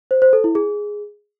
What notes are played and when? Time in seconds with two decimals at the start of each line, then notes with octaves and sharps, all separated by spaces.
0.11 C5
0.22 C5
0.33 A4
0.44 E4
0.55 G#4